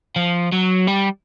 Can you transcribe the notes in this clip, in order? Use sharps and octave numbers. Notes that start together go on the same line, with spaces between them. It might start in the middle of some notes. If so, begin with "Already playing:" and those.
F3
F#3
G3